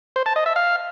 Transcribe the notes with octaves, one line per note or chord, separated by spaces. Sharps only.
C5
A5
D#5
E5
F5